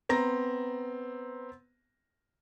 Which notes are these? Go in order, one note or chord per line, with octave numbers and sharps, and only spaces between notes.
B3 C4 A#5 A#6